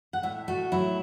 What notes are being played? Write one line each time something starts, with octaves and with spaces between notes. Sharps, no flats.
F#5
A2 E5
A3 F#4
F#3 E4